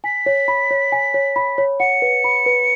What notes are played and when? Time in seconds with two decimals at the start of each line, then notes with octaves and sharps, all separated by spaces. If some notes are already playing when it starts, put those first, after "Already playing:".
0.04 G#5 B6
0.26 C#5
0.48 B5
0.71 C#5
0.92 G#5
1.14 C#5
1.36 B5
1.58 C#5
1.80 F#5 C#7
2.02 B4
2.24 B5
2.46 B4